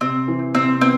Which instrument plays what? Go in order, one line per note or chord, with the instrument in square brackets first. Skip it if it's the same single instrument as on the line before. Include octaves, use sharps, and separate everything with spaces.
[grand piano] C3 [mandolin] C4
[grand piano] E3
[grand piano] C3 [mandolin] C4
[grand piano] B3 [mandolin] C4